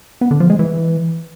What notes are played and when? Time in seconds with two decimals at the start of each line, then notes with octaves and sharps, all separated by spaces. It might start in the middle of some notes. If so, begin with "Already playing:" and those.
0.21 B3
0.31 D3
0.40 F3
0.50 G#3
0.59 E3